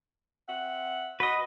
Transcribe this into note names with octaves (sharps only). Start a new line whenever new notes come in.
C4 E5 F#5
F#4 B4 D#5